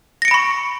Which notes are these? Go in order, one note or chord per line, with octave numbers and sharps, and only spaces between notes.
B5 C#6 A#6 C#7 D7